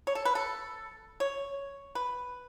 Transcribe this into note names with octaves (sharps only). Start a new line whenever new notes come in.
C#5
A4
B4
A4
C#5
B4